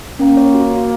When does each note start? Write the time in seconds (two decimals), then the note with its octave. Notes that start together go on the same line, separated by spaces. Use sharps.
0.19 A#3 C#4
0.37 C#5
0.54 F#4
0.71 F#4